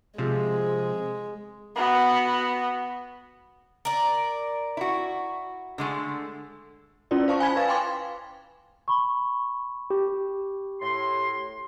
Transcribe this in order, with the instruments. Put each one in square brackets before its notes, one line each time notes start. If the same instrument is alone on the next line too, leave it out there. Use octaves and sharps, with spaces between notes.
[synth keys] C3 F3 [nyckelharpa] G#3
[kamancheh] B3 F#4
[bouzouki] A#4 D5
[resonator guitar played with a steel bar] E4 F#4
D3 G#3 A3
[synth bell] C#4 E4 F4 D5
C5 F5 A5 C#6
G#5 B5 G#6 B6
B4 F5 G#5 A6
G5 G#5 C6 D6
[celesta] B5 C#6
[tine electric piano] G4
[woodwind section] A2 C6